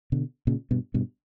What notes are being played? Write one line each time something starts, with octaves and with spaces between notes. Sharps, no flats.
B2 D3
A#2 C#3
G2 B2
G2 B2